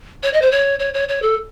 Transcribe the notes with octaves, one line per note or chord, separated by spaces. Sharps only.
C#5
D#5
C5
C#5
C#5
C#5
C#5
A4